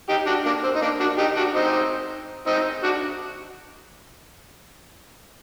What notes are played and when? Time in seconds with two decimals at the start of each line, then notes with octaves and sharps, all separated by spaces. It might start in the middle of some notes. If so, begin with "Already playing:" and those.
0.09 D#4 G4
0.26 D4 F#4
0.46 A#3 D4
0.63 C4
0.75 D#4
0.82 A#3 D4
1.00 D4 F#4
1.18 D#4 G4
1.36 D4 F#4
1.55 C4 D#4
2.46 C4 D#4
2.83 D4 F#4